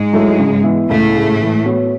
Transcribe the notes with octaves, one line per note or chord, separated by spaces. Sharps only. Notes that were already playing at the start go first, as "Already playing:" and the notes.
Already playing: G#2 G#3
F#3 A3 E4
C#3
E3 B3 E4
C#2 A2 A3
C#3 G#3
E3
B3 F#4 C#5